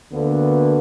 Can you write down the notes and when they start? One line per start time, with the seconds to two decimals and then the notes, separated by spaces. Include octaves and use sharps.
0.11 D2 D3 A#3 B3